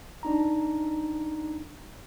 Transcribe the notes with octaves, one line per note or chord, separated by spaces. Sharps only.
D4 D#4 A#5